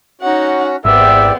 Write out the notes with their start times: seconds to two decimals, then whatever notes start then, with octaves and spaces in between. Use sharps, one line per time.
0.21 C#4 D#4 F#4 F#5
0.85 G#1 E2 B3 C4 G4 D5 E5